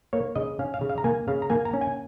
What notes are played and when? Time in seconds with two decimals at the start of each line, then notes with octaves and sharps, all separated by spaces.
0.13 A#3 C#5
0.36 C#3 D#5
0.59 C#4 F5
0.74 F5
0.81 C#3
0.89 F5
0.98 A#5
1.04 A#3 G#5
1.28 C#3 F5
1.42 A#5
1.50 A#3 G#5
1.65 A#5
1.73 C#4
1.81 G#5